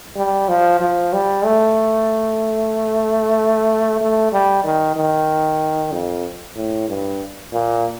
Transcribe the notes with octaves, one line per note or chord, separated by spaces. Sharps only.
G3
F3
F3
G3
A3
A3
G3
D#3
D#3
F2
A2
G2
A#2